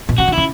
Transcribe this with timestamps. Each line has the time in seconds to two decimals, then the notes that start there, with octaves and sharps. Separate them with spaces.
0.09 B2
0.18 C#3 F#4
0.28 D3
0.33 C#3 E4